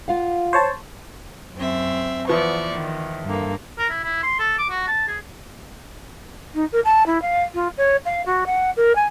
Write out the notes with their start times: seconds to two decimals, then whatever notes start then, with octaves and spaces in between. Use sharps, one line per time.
0.08 F4 F5 F#5
0.53 C5 C#5 A5
1.56 F#2 C4 E5
2.28 E2 F3 B3 D5 C#6
2.74 D#3
3.24 G2 D3 A#3
3.78 A#4
3.90 E4
4.04 E4
4.23 C6
4.39 A4
4.58 D6
4.70 F#4
4.88 A5
5.08 G#4
6.54 D#4
6.72 A#4
6.84 A5
7.06 E4
7.22 F5
7.54 F4
7.77 C#5
8.05 F5
8.26 F#4
8.46 F#5
8.76 A#4
8.95 G#5